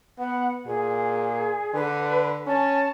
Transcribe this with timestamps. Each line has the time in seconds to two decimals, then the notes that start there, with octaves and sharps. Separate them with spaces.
0.18 B3 F#5
0.66 A#2 G#4
1.74 D3 B4
2.47 C#4 A5